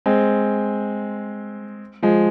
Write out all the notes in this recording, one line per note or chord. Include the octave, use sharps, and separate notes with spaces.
G#3 C4
F3 G#3